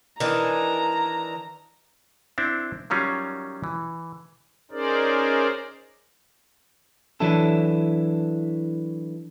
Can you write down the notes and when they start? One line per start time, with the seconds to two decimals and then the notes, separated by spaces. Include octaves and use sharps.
0.20 D#3 E3 D4 A#5
2.38 C4 D4 E4
2.90 D#3 F#3 G3 C#4 F4
3.64 E3
4.71 C#4 D#4 G#4 A#4 C5 D5
7.20 E3 F#3 D4 E4 A4